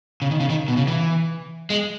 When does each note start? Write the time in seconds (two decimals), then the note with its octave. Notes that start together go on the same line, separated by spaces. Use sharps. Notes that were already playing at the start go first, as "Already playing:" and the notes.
0.22 C#3
0.31 D#3
0.40 C#3
0.50 D#3
0.68 B2
0.77 C#3
0.87 E3
1.70 G#3